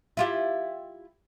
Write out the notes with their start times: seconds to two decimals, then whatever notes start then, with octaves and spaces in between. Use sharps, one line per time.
0.17 E4 F4 G4